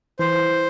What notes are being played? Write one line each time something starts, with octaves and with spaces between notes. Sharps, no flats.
E3 C5